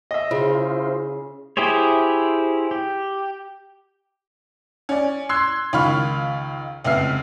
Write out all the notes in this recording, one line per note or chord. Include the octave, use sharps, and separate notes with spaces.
D#5 E5
C#3 E4 F4 C5
E4 G4 G#4 C5 C#5
G4
C#4 D5
C6 E6 F#6 G#6 C7
C#2 D#3 F4 B5 C#6 F6
F1 C#2 B3 E5 F6 C7